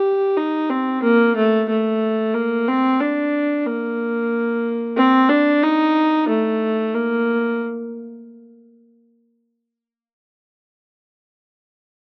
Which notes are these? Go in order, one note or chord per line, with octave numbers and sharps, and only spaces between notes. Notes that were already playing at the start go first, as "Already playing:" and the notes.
Already playing: G4
D#4
C4
A#3
A3
A3
A#3
C4
D4
A#3
C4
D4
D#4
A3
A#3